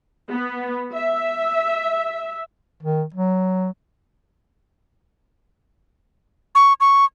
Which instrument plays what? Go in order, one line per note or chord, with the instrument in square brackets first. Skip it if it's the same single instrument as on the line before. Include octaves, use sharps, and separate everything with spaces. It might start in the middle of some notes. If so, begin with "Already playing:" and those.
[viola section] B3
E5
[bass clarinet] D#3
F#3
[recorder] C#6
C#6